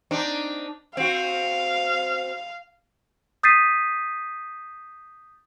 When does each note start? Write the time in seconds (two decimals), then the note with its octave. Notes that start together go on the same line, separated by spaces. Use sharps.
0.11 C4 D4 D#4
0.97 C4 F#4 F5
3.43 D#6 G6 A6 B6 C7 D#7